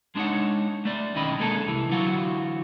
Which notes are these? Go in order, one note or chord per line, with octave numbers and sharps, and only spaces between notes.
G#3 D4 D#4 F#4 C#5 F#5
A3 D5
B1 D#3 C#4 D#5 B5
G#3 A#3 D4 G#4 A4
C2 E3
D3 E3 F#3 F4 F#4